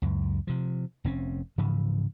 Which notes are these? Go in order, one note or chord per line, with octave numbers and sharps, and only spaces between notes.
C#2 F#2
C3 F3
F1 C4 C#4
G#2 C#3 E3 F3